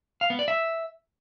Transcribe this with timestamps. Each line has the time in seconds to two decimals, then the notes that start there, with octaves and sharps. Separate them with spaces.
0.21 F5
0.30 B3
0.39 D5
0.48 E5